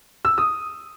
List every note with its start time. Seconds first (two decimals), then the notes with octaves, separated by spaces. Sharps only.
0.25 E6
0.38 D#6